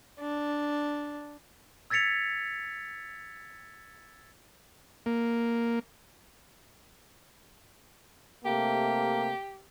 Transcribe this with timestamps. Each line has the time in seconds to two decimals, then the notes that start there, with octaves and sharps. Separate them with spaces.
0.20 D4
1.90 E6 G#6 A6 B6 C#7 F7
5.06 A#3
8.45 C3 A3 A#3 G4